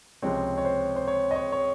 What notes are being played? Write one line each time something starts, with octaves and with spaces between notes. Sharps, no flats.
C#2 C3 F3 G#3 C4 C#5
C#5
C5
C5
C#5
D#5
C#5
C#5